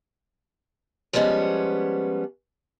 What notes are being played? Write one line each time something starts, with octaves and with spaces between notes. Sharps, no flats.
F3 G3 G#3 B3 C#4